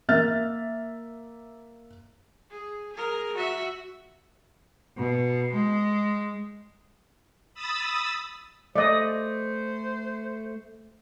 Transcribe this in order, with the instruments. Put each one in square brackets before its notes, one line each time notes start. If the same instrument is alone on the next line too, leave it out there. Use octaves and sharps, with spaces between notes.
[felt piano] A#3 E5 F6 A6
[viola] G#4
G#4 A#4
F#4 E5
[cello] B2
G#3
[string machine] B5 D#6 E6 A6
[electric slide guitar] A3 [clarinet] C5 [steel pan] D5 D#5